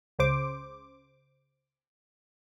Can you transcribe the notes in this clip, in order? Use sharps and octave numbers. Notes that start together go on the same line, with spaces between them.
C#2 C#3 C5 D6